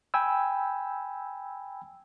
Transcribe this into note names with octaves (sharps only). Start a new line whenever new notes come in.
G5 G#5 B5 E6